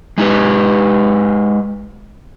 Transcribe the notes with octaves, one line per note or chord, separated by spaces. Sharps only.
G#3 D#4 G4 B4